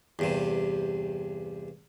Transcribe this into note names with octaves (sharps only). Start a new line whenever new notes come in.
E2 G2 C3